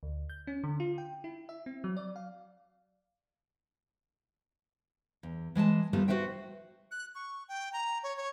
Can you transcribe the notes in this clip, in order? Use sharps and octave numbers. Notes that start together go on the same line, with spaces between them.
D2
G6
C#4
D3
F4
G5
E4
E5
C4
F#3
D5
F5
E2
E3 G#3 G#5 A5
D#3 F3 G3 A3 B3 E4
F#4 A4 B4 C5 E5 G5
F#6
C#6
G5
A#5
C#5
C#5